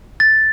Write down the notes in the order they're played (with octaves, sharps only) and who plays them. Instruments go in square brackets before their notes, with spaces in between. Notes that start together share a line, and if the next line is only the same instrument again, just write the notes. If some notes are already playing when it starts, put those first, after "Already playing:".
[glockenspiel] A6